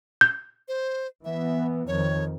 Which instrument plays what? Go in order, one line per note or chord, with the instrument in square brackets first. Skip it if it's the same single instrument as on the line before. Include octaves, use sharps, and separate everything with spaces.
[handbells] G6
[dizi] C5
[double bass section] E3 B3 [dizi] E5
[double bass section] F2 D#3 [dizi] C#5